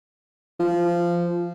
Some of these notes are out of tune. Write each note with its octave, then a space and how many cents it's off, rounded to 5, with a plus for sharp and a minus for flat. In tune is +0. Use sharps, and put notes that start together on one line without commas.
F3 -15